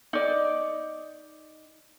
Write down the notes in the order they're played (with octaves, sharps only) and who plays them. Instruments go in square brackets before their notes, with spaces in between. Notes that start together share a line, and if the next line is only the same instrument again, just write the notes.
[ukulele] D#4 D5